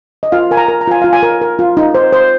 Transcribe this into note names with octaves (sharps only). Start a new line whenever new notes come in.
D#5
F4 F5
A#4 G#5
A#5
A#4
A#5
F4 G#5
F4 F5
G#5
A#4
A#4
F4
D#4
C5
C5